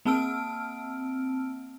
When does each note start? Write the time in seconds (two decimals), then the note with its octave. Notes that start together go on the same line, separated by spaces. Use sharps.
0.05 A#3 C4 A5 E6 F6 D7